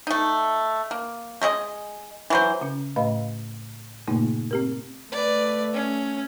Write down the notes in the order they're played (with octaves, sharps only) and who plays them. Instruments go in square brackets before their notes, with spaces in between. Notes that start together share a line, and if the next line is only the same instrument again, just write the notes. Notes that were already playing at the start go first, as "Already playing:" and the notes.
[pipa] A3 D#4
A#3
G#3 A3 G#4 D#5
E3 F#3 C5
[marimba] C#3 C#4
A2 A3 B4 D#5 F5 B5
G2 A#2 C#3 A3 A#3 D#4
C4 G4 A#4
[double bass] A3 [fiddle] B4 D5
[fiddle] C#4